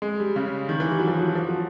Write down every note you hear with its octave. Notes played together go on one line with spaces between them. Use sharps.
G#3
G3
C#3
D#3
E3
G3
F#3
F3
F#3
F3
F#3